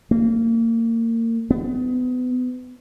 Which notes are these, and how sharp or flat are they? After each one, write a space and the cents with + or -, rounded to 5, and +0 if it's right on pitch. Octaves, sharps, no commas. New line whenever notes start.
A#3 -30
B3 +30